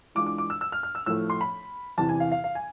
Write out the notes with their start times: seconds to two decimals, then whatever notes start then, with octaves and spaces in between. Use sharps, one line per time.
0.15 E3 G#3 D4 F4 D6
0.26 D6
0.38 D6
0.50 E6
0.61 E6
0.72 F6
0.83 F6
0.95 E6
1.06 A2 F3 A3 E6
1.30 C6
1.41 B5
1.98 E2 C3 E3 A5
2.09 G#5
2.20 F5
2.32 F5
2.44 F5
2.55 G#5